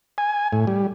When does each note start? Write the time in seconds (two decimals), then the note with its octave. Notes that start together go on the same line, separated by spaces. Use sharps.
0.18 G#5
0.53 A2
0.67 G3